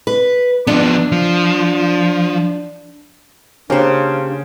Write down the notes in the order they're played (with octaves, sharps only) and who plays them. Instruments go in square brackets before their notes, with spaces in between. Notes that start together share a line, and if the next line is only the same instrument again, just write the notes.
[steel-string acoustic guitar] B4
[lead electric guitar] F3 B3 [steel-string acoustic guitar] D4
[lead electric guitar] F3
[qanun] C#3 A#3 [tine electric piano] C#4 G4 F5 [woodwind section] D4 C5